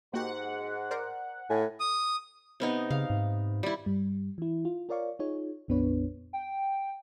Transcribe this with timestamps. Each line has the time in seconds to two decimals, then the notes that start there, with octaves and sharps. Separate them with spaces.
0.14 G#2 A#3 F#4 G4 F#5
0.91 A#4 C5 D5
1.50 A2 G#5
1.80 D#6
2.60 C3 B3 D#4
2.91 C#3 F5
3.10 G#2
3.63 G3 E4
3.86 G2 G3
4.38 E3 E4
4.65 F4
4.89 F4 A#4 C#5 D5 F5 C#6
5.19 D#4 F4 G#4 C#5
5.68 A#1 F2 B3 D4 B4 C#5
6.33 G5